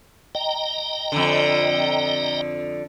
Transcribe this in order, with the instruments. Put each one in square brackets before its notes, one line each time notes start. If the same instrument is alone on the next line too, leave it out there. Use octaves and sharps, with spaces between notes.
[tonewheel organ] D#5 G5 A#5
[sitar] F2 D3